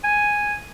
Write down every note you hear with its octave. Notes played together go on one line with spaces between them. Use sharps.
G#5